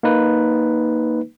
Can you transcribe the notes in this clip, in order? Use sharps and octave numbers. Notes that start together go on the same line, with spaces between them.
A#3 D#4 B4